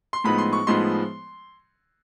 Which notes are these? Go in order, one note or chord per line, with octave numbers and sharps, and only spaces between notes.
C6
A2 F3 G#3 B3 D#4 B5
C6
C#6
A2 F3 G#3 B3 D#4 C6